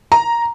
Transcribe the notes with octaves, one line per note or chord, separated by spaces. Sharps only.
A#5